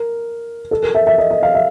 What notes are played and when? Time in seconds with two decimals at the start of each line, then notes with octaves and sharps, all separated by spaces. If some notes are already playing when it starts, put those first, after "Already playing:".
Already playing: A#4
0.71 A4
0.83 A#4
0.95 E5
1.07 E5
1.18 D#5
1.31 D#5
1.43 F5
1.55 E5